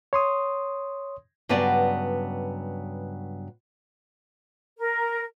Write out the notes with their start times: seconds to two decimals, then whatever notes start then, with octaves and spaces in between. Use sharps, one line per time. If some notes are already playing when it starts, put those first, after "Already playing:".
0.13 C#5 C6 D#6
1.49 G2 C#3 F#3 B3 B4 D5
4.79 A#4